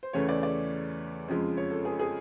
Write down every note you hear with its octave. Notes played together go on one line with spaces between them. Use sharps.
C5
E2 C#3 E3 A3 C#5
D5
D5
F2 C#3 F3 G#3
C#5
A4
G#4
G#4